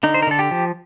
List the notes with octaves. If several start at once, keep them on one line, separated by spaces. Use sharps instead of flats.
D3 D#4
C5
A#4
D3 A4
G4
F3